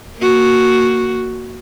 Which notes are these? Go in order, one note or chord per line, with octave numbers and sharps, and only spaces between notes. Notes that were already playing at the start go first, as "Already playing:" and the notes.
A#3 F#4